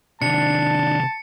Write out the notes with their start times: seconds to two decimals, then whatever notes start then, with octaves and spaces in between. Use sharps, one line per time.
0.22 C3 D#3 D4 A5 C#7